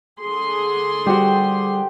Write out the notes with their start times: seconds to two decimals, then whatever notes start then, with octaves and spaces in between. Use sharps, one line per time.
0.21 D3 G#4 C6
1.06 G3 F#4 G4 C5 F#5